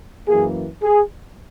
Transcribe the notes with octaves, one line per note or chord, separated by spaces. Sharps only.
F#2 E3 A#3 G#4
G#4